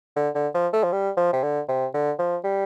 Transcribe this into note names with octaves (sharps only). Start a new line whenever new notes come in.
D3
D3
F3
A3
F3
G3
F3
C3
D3
C3
D3
F3
G3